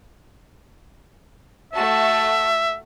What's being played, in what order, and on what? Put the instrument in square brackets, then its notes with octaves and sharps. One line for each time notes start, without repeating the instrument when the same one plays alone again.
[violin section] A3 F#4 A5 [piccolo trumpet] E5